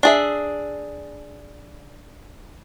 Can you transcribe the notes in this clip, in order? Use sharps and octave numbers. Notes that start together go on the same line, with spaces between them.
D4 G#4 E5